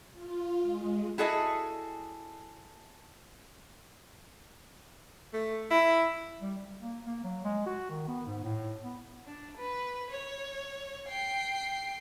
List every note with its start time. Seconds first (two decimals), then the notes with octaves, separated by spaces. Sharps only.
0.12 F4
0.60 G#3
1.18 E4 F#4 G#4 A4 D5 D#5
5.33 A3
5.70 E4
6.42 G3
6.58 G3
6.79 A#3
7.06 A#3
7.24 F#3
7.44 G#3
7.66 F#4
7.90 D#3
8.08 B3
8.27 G#2
8.43 A2
8.83 B3
9.26 D4
9.57 B4
10.10 C#5
11.09 G5 C7